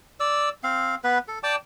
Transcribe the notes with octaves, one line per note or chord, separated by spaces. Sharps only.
D5 E6
C4 F5
B3 B4
A4
D5 G5 A5 D6